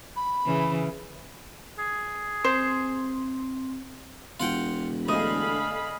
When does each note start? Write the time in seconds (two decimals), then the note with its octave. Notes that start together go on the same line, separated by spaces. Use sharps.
0.16 B5
0.46 C#3 E3
1.79 G#4
2.45 C4 C5
4.40 E1 F4 F#5 G5
5.08 D3 A3 G#4 D#5 F5 B5